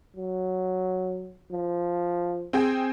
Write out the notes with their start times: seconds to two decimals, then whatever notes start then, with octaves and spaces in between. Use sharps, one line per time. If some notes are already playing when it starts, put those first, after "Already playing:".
0.16 F#3
1.51 F3
2.53 C4 G#4 G5